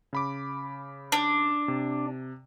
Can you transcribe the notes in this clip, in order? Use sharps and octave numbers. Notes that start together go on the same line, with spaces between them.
C#3 B5 D6
D4
C3